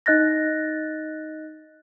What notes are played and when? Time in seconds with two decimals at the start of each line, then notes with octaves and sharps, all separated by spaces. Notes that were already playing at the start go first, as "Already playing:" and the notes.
0.06 D#4 D#5 F#6 A6 A#6